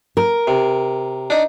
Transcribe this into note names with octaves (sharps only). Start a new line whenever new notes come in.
A#4
C3
D4 D#4